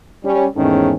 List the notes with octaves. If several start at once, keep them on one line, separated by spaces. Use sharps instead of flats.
G3 C#4
E2 G#2 D#3 A3 C#4